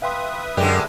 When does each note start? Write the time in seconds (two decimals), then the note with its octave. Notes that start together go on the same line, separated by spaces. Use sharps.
0.02 B4 E5 F5 G5 C6 D#6
0.57 F#2 D3 G#3 G4 A#4 D5